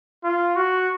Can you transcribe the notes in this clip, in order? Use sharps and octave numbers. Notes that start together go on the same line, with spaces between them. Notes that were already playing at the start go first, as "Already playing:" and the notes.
F4
F#4